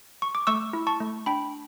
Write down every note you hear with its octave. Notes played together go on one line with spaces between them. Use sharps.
C#6
D6
A3 C#6 E6
E4
A5 C#6
A3
D4 G5 B5